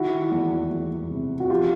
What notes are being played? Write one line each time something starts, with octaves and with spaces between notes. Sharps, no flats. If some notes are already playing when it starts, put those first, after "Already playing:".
Already playing: D#3 E4 F#4
E2
E2
C3
F#4
F3 F4 G4